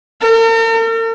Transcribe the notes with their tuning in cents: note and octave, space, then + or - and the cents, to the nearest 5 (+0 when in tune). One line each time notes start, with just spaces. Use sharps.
A#4 -45